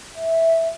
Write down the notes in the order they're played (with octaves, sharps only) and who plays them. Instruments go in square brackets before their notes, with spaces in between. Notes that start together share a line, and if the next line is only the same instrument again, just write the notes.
[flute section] E5